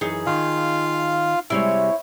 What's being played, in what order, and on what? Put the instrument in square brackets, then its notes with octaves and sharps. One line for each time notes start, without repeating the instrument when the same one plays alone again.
[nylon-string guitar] F#2 E3 [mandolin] D#4 G#4
[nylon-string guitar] D#3 [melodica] F4 F5
[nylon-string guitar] C3 G3 G#3 [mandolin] E4 C5 C#5